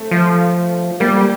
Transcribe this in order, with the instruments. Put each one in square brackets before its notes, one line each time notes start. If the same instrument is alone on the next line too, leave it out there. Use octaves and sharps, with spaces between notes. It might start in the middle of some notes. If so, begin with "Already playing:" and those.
Already playing: [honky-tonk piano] A3
[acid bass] F3
[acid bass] G3 [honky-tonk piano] A#3